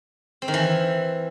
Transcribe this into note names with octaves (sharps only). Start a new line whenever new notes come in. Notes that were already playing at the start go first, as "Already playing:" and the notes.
C4
D#3
E3